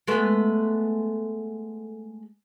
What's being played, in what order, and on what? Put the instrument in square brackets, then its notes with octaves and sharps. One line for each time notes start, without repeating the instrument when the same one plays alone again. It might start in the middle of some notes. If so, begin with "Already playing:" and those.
[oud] G#3 A3 B3